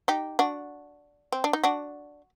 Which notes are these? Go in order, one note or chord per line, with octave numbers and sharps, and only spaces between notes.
D#4 G4
D4 F#4
C4
D4
D#4
D4 F#4